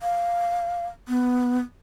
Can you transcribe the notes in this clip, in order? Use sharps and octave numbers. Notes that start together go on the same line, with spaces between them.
F5
B3